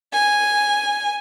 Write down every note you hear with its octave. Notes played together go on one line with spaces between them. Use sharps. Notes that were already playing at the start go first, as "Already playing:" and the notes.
G#5